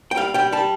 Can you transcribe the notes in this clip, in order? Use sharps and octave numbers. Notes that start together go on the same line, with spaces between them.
G5
G3 F5
G3 G5
G3 A5